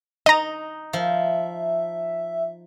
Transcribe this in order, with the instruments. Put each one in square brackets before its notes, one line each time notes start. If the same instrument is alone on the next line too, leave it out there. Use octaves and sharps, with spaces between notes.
[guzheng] D#4 [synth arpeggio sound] D#5 A#5
[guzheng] F3 [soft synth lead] E5